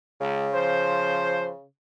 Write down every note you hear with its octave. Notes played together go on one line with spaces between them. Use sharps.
C#2 C#3
F3 C5